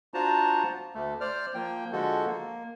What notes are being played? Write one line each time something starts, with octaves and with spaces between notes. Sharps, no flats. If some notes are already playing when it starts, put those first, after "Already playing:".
D4 F4 F#4 C5 A5 A#5
D2 A3
C5 D5 F6
F3 A#3 G5
D3 F3 G#3 F#4 A4
A#3